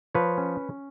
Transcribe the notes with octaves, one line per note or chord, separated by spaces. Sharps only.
F3 B4 C#5
C#4